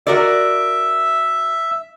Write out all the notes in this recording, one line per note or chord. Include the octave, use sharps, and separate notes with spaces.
F#4 A#4 D5 E5